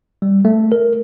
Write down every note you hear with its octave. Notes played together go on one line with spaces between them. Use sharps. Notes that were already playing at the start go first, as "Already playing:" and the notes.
G3
A3
A#4